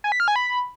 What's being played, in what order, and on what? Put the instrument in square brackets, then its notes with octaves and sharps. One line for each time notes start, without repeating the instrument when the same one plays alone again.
[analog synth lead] G#5
B6
F6
G#5
B5